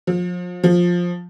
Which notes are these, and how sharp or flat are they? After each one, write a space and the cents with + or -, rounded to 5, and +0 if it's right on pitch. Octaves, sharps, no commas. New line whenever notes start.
F3 +35
F3 +15